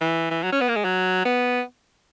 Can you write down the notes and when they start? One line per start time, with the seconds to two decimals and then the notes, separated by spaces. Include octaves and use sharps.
0.01 E3
0.31 E3
0.43 F#3
0.52 C#4
0.61 B3
0.69 A#3
0.76 G#3
0.84 F#3
1.25 B3